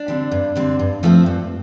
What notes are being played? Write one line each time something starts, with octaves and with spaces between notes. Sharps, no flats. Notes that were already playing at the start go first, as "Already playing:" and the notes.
Already playing: D4
D3 G3 C4
G2
D3 G3 C4
G2
F3 A3 C4
G2